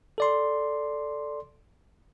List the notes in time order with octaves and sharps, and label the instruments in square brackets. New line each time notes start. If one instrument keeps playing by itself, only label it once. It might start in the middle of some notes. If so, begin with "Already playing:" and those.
[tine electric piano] A4 D5 C6